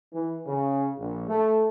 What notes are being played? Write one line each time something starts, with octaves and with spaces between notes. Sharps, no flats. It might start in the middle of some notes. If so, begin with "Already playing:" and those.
E3
C#3
A#1
A3